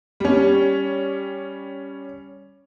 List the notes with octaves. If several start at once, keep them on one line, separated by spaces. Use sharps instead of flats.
G3 C#4